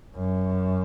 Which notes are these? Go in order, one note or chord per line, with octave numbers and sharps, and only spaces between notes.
F#2